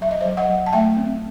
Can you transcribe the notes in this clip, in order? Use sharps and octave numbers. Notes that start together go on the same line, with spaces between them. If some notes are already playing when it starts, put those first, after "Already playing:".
F#3 E5
D#5
F#3 C5 E5
D#5 F#5
F#3
A5
A3 E5 G5
C4